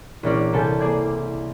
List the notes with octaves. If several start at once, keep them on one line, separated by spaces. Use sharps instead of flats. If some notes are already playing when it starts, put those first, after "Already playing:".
A#1 E3 C#4 D5
C2 A4 G#5 A5 G6
A#3 G#4 C5 D5 G#6